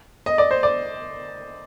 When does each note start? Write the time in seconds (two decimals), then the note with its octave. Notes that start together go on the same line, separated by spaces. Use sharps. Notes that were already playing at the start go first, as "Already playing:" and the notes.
0.26 D#5
0.38 D5
0.51 C5
0.63 D5